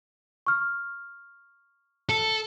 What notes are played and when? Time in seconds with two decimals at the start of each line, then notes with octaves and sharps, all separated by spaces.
0.47 C#6 F6
2.09 A4